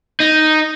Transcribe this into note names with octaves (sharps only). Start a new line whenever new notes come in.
D#4